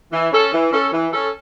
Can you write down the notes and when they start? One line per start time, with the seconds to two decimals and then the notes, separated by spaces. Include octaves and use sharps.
0.12 E3
0.32 C#4 A4
0.53 E3
0.72 C#4 A4
0.92 E3
1.12 C#4 A4